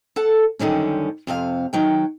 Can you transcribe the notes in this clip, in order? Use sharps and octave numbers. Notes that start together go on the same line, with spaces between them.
A4 F#5 A5
F#2 D3 D#3 G3 C#4
F2 C3 G#4 F5
D#3 F#3 G5